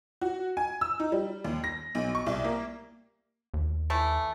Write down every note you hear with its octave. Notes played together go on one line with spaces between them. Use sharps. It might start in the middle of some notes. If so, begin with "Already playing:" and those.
F#4
G#5
E6
D#4
G3
D#2
A#6
B1
C#6
C2
A#3
D#2
E3 A3